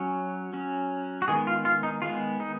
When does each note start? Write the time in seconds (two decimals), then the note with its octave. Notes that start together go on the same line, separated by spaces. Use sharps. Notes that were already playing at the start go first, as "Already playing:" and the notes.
Already playing: F#3 C#4
0.54 F#3 C#4
1.22 F#4
1.28 D#3 G#3 B3 G#4
1.47 F4
1.65 F4
1.83 D#4
2.02 D#3 G#3 B3 F4
2.40 D#4